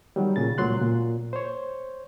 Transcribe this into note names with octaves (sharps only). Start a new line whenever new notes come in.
D#3 F#3 G3
A#2 C#3 A6
C#2 A#2 F#3 C6 F#6
A#2
C5 C#5